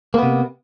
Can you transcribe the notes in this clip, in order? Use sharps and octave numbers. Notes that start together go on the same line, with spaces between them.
C3 A#3 B3